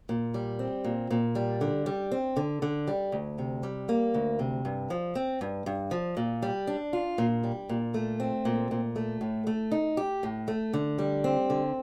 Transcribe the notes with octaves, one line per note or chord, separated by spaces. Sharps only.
A#2
G3
C4
A#2
A#2
G3
D3
G3
C4
D3
D3
G3
D2
C3
G3
A#3
D2
C3
G2
F3
C4
G2
G2
F3
A#2
G3
D4
F4
A#2
G3
A#2
A3
C4
A#2
A#2
A3
A2
A3
D#4
G4
A2
A3
D3
G3
C4
D3